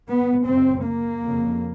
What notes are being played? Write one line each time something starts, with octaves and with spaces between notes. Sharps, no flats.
B3
F#2 C#3 C4
A#3
F2 C#3